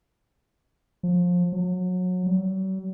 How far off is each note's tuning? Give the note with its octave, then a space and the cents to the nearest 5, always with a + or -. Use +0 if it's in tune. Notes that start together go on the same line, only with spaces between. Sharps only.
F3 +25
F#3 -25
F#3 +45